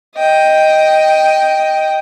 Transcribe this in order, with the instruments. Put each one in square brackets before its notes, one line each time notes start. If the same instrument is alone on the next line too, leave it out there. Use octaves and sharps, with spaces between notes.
[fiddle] D#5 G5